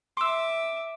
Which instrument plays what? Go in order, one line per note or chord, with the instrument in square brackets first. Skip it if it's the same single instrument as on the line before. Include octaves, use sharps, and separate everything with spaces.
[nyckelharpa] E5 D6 [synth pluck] C6 E6